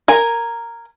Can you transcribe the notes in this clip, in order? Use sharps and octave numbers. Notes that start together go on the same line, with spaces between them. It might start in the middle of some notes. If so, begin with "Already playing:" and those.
A#4 G#5